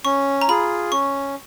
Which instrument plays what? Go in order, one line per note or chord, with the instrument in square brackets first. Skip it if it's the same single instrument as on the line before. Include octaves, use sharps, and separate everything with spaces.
[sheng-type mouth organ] C#4 [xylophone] C#6
[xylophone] A#5
[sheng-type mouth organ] F4 G#4 [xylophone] B5
[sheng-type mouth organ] C#4 [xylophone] C#6